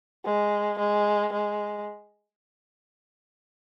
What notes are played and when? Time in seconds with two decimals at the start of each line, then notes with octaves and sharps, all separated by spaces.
0.25 G#3
0.79 G#3
1.33 G#3